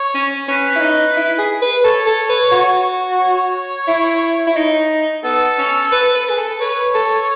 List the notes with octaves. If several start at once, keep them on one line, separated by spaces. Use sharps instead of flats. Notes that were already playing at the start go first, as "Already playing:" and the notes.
Already playing: C#5
C#4
C#4 B4
E4
D#4
E4
G#4
B4
A4 C#5
A4
B4
F#4
C#5
E4
E4
D#4
B3 A4
C#4
B4
B4
G#4
A4
B4 C#5
A4